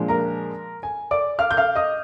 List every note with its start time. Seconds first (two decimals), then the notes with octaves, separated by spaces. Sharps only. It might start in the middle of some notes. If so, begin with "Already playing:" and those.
Already playing: A#2 F3 G#3 D4
0.08 A#4 A#5
0.83 G#5
1.11 D5 D6
1.39 F5 F6
1.51 G6
1.57 F5 F6
1.75 D#5 D#6